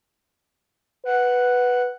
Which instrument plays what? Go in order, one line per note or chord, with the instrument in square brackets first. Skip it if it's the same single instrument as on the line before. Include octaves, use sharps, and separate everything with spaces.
[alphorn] B4 [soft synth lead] F#5